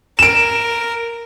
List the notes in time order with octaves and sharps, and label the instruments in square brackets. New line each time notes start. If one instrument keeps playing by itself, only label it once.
[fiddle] A#4 [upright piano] D7 E7